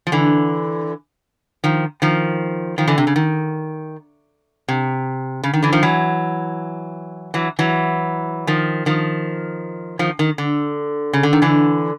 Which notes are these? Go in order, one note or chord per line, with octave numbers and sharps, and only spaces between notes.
F3
D3 E3
D#3 F3
D#3 F3
D#3 F3
D3 E3
C3
C#3
D#3
C3
C#3
D#3
D3 E3
D#3 F3
E3 F#3
E3 F#3
E3 F#3
D#3 F3
D#3 F3
D#3 F3
D#3
D3
C#3
D3
D#3
D3 E3